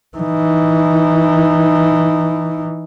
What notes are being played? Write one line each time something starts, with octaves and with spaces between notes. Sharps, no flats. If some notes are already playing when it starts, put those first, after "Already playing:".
E3 D#4